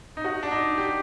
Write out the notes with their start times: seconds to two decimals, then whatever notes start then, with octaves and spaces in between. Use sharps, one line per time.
0.17 D#4
0.25 F#4
0.43 D4
0.51 D#4
0.78 G4